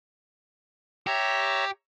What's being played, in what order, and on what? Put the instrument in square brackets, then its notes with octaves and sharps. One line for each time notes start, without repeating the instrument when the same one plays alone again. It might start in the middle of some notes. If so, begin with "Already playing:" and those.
[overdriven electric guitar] G4 [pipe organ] C#5 E5 A#5